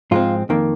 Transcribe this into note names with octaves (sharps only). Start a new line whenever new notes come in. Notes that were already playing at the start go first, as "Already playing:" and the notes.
G#2 F3 G#3 C4 F4
F2 D#3 A#3